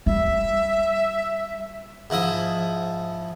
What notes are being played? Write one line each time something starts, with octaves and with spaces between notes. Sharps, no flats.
G3 E5
G#2 F3 E4 D#6